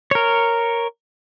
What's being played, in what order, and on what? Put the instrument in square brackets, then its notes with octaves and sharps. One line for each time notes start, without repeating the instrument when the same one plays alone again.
[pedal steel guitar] A#4 C#5